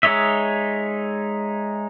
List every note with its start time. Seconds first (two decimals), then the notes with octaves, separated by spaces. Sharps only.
0.03 G#3 D#4 C#5 D#5 E5